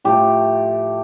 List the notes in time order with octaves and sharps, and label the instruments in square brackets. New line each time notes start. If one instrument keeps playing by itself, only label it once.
[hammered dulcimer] A2 F3 A3 G4